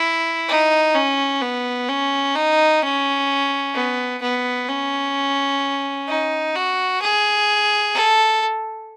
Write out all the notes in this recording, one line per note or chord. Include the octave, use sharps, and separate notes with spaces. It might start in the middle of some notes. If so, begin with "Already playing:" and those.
Already playing: E4
D#4
C#4
B3
C#4
D#4
C#4
B3
B3
C#4
D#4
F#4
G#4
A4